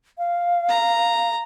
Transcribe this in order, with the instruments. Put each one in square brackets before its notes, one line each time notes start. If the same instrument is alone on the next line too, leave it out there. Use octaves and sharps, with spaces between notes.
[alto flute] F5
[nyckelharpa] A#5